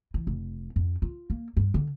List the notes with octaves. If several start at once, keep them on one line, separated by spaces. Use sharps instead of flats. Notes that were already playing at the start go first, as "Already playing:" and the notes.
E3
F1
F2
F4
A#3
G2
D3